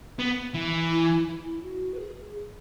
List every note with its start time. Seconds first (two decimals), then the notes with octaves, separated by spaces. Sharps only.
0.19 B3
0.54 E3
0.91 E4
1.27 E4
1.63 F#4
1.94 B4
1.99 G#4